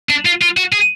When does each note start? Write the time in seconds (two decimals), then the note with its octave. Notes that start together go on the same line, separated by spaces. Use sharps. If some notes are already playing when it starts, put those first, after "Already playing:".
0.10 D4
0.26 F4
0.42 F4
0.57 F#4
0.72 G#4